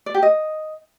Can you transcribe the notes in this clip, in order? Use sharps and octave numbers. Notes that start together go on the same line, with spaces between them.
D5
G4
D#5